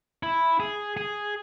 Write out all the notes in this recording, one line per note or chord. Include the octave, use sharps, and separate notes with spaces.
E4
G#4
G#4